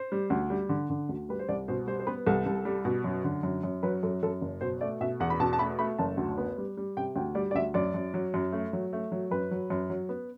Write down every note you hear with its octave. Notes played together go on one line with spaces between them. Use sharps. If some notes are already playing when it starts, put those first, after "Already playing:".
Already playing: C5
G3
D2
G3
D3
D3
D2
G3 B4
C5
C2 D5
B2 C5
G3 C5
C5
B3 B4
C2 A4
C2
G3
B2
F#2
D3
F#2
F#2
F#3 B4
F#2 A4
F#2 A4
F#1
B2 C5
A3 D5
B2 E5
E2 F#5
B5
B2 A5
A5
A3 B5
A3 B5
F#1 A5
D2
B3
G3
G3
C3 G5
D2 G5
G3 D5
D5
D2 E5
F#2 D5
F#2
F#3
F#2
A3
F#3
A3
F#3
F#2 B4
F#3
F#2
F#3
B3